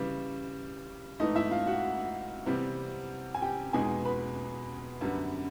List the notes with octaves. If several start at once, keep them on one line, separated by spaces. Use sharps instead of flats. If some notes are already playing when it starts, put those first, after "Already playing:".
Already playing: C#3 E3 G3
G#2 E3 A3 D#4 D#5
E4 E5
F4 F5
F#4 F#5
C3 E3 G3 B3
G#5
G4 G5
E2 B2 G#3 B3 D#4 G#4 G#5
B4 B5
F#2 D3 G3 B3